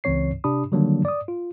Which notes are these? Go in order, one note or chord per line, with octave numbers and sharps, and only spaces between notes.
C#2 C#3 E3 C4 C#5 C7
C3 D4 G4 B5 D#6
D3 D#3 F#3 G3 A#3 D4
D5 D#6
F4